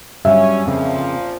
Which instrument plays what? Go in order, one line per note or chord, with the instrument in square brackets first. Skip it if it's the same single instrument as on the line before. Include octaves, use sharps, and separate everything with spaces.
[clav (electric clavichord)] G2 F#3 G3 [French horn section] C#4 [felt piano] E5
[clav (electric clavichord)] F2 C#3 [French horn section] A#2 F3